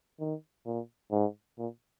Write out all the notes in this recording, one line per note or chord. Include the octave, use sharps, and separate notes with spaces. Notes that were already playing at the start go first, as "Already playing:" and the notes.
D#3
A#2
G#2
A#2